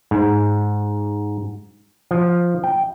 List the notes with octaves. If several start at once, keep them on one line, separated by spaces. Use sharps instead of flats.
G#2
F3
G5